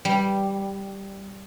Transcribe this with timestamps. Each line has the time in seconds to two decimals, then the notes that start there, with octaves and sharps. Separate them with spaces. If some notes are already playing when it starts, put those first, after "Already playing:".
0.05 G3